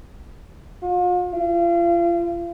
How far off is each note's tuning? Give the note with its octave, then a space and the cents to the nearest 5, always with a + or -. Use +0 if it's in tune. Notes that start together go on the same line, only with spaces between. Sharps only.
F4 +40
F4 -35